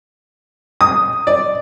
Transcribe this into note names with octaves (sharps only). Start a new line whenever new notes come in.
D#6
D5